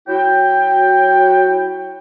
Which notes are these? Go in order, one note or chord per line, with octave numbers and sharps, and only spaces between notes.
F#3 E4 F#4 G5